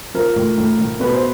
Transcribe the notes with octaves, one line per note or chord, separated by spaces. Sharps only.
F3 A#4
A2
A2
A2
B2 B4
C5